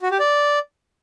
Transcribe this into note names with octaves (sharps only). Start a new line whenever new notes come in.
F#4
G4
D5